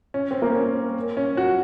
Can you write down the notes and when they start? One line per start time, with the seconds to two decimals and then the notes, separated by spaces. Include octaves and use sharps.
0.14 C#4
0.31 C4
0.42 A#3
0.55 C#4
1.17 C#4
1.37 F#4